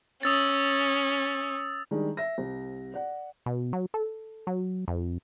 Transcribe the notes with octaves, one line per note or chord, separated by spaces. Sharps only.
C#4 D#6 E6 A6
D#3 G3 G#3 D4
E5 A#6
C2
D5 F#5
B2
F#3
A4
F#3
F2